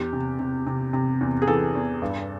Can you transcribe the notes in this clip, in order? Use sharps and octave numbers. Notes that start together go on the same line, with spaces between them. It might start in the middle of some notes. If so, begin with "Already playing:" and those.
Already playing: E2 G4
C3
C3
C3
C3
E2
G#4
E3 A4
E2
G2